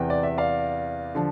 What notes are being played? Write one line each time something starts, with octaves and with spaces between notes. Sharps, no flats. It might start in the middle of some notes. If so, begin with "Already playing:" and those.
Already playing: E2 C3 E3 G5
D5
E5
D5 F5
D3 F3